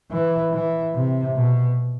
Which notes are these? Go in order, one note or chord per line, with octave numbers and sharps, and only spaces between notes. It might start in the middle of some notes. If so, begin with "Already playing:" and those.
E3
E3
C3
B2